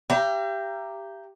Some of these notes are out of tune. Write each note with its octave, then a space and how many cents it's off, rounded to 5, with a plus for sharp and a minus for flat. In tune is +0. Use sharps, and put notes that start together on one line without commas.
G4 +0 E5 +45 A#5 +0